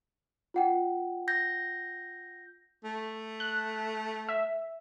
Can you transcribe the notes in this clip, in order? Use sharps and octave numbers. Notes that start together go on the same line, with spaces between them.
F4 F#5 G5
G6 A#6
A3
F#6
E5